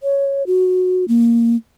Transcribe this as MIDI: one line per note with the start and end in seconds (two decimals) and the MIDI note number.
0.03 0.43 73
0.47 1.05 66
1.08 1.56 58